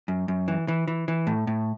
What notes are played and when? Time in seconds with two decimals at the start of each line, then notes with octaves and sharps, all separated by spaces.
0.08 F#2
0.28 F#2
0.48 E3
0.68 E3
0.88 E3
1.08 E3
1.27 A2
1.47 A2